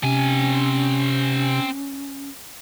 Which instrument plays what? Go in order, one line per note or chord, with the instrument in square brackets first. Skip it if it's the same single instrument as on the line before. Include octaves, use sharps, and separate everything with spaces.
[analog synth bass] C3 [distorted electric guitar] C4 G#5 [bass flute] C#4